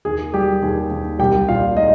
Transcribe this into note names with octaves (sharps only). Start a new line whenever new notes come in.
D#2 G#4
G3 G4
D#2 G#4
D#2
C2 G4 G5
A#2 F4 F5
G#3 D#4 D#5